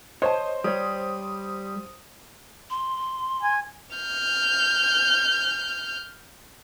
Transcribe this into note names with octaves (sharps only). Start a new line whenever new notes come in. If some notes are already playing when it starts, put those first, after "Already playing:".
C5 C#5 D#5 A5
G3 C#5 D#6
C6
G#5
F6 G6